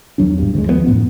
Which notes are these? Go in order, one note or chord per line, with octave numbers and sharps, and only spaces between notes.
E2 F#3 D4
A1 G2
D2 G#3
D#2 F3 A3 B3
F#2 A2 B3